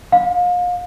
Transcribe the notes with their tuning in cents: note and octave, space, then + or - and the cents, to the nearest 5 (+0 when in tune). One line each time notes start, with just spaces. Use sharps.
F5 +35